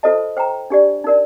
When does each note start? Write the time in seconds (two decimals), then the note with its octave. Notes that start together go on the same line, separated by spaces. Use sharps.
0.03 F4 A4 C5 D#5 A5
0.37 C5 G5 A#5
0.70 D4 G4 D5
1.04 D#4 A#4 D5